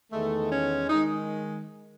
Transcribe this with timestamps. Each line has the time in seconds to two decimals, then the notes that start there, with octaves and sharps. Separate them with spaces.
0.12 E2 D#3 G#3 A3
0.50 C#4
0.89 D#3 G#3 D#4